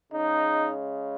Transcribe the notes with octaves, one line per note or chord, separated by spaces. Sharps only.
C#3 G#3 D#4